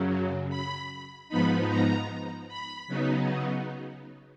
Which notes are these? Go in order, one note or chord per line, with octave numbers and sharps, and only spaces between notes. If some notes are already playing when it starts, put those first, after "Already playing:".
Already playing: F#2 C#3 F#3
B5
G#2 F3 B3 D#4 B5
A#5
B5
C#3 F#3 B3 D#4